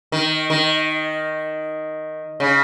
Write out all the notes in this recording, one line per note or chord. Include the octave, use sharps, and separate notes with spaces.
D#3
D#3
C#3